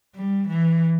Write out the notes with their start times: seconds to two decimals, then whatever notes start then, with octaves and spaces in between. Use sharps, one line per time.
0.15 G3
0.48 E3